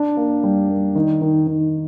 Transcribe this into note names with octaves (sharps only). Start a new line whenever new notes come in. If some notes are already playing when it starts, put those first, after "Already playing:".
Already playing: D4
A#3
G3
A#3
D#3
D#3
D#3